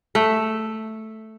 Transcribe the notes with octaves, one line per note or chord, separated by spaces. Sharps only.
A3